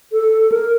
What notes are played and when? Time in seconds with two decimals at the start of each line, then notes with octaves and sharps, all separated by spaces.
0.13 A4
0.52 A#4